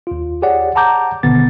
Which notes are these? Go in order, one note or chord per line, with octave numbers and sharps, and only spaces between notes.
D#2 F4
G4 G#4 C#5 D5 F#5
F#5 A5 A#5 D6 G6
G#1 B2 D3 B3 A6